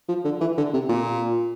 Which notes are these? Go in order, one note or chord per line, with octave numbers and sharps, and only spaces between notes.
F3
D3
E3
D3
C3
A#2